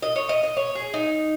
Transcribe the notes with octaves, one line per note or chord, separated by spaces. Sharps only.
D#5
C#5
D#5
D#5
C#5
G#4
D#4